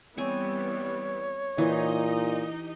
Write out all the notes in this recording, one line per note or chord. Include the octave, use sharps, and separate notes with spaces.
E3 G3 B3 C4 C#5 G#5
A#2 E3 D#4 G4 D#5